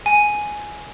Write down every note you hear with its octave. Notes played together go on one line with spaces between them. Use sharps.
G#5